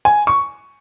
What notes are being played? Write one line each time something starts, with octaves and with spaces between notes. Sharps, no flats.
G#5
C#6